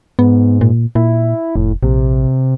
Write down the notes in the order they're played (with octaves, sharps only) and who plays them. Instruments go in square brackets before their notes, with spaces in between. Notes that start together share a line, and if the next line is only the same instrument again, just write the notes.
[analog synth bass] G#2 [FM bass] B3
[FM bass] A#2
[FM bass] A#2 [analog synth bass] E4
[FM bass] F1 [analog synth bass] A2
[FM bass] A#1 [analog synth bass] C3